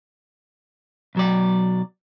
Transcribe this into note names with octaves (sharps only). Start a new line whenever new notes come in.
B1 F#3 D5